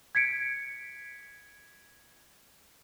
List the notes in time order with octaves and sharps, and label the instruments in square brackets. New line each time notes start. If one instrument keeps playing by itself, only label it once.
[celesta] G#6 B6 C#7 D7